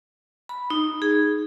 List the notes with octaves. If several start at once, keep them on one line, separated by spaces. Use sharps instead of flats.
B5
D#4
G#4